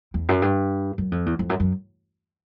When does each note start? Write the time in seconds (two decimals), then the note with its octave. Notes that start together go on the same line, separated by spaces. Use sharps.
0.14 E2
0.29 F#2
0.42 G2
0.98 F#2
1.12 F2
1.26 E2
1.39 F2
1.49 F#2
1.60 F#2